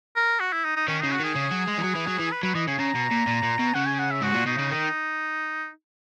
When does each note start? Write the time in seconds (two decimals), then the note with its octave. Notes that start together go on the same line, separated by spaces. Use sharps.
0.16 A#4
0.40 F#4
0.53 E4
0.65 D#4
0.76 D#4
0.88 D#3 C#4
1.00 C#3 D#4
1.12 F#4
1.20 D#3 G#4
1.36 C#3
1.52 F#3
1.68 G#3
1.78 E3
1.84 F#3
1.96 E3
2.08 F#3
2.19 E3
2.32 B4
2.43 F#3 B4
2.55 E3 D#5
2.67 C#3 G#5
2.79 C#3 A#5
2.95 B2
3.11 A#2
3.27 A#2
3.43 A#2
3.59 B2
3.74 C#3 F#5
3.86 G#5
3.99 F#5
4.11 E5
4.21 G#2 F#4
4.33 A#2
4.46 B2 D#4
4.58 C#3
4.71 D#3 D#4